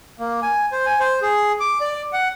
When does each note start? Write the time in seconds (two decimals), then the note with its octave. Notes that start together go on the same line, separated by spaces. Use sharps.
0.19 A#3
0.42 G#5
0.72 C5
0.86 G#5
1.00 C5
1.22 G#4
1.60 D6
1.81 D5
2.13 F#5